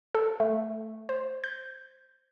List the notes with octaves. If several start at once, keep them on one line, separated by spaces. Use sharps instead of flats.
A4
A3
C5
G6